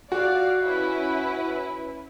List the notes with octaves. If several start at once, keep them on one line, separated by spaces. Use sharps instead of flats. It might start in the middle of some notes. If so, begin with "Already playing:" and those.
F#4 D5 F5
C#4 E4 B4